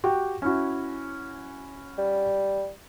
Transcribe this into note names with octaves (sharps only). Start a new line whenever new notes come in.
F#4 G4 G5
C#4 E4 F#4
G3